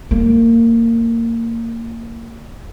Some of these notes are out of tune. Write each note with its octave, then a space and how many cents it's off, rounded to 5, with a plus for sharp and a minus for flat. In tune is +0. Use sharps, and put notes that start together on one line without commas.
A#3 -20